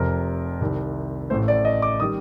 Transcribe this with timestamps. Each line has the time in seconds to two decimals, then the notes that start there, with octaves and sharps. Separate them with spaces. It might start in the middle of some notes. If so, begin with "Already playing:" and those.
Already playing: F1 F2 C3 A#4
0.61 C2 C3 D#3
1.30 A1 A2 A3 C5
1.48 D5
1.65 D#5
1.82 D6
2.00 D#3 G3 D#6